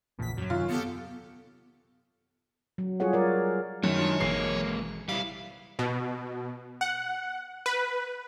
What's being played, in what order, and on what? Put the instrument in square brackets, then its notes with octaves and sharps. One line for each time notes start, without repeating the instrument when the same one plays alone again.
[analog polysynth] A#1 B6 [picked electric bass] E2 A#2 C#3
[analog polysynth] F#2 F#3
[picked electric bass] C3 D#3 [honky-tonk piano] F4
[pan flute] B3 [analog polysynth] G4 A4 C#7
[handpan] F#3
G3 F4 G#4 A4 C#5 F#5
F4 A#4 D5
[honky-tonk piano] F#2 [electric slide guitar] D#3 [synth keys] A3 [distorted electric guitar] C#5
[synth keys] G#3 D4 F4
[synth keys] G#1 B2 E3 [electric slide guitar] G#3 A#3 [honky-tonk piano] C7
[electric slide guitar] G3 E4 [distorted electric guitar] F5 [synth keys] B6 D7
[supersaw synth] B2
F#5
B4